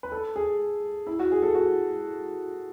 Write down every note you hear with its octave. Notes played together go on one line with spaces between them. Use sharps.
B4
A4
G#4
E4
F#4
G#4
A4
F#4